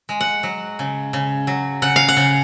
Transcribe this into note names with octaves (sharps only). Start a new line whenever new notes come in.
G#3
F#5
F#3
C#3
C#3
F#3
C#3 F#5
F5
F#5
C#3